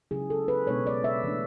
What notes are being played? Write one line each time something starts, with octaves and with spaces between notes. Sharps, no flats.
C#3 F#3 C#4 E4 G#4
A4
B4
B2 G#3 B3 D4 C#5
D5
E5
E3 A3 D4